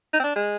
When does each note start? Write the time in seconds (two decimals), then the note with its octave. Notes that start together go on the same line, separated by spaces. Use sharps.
0.14 D#4
0.20 C4
0.24 D4
0.36 G#3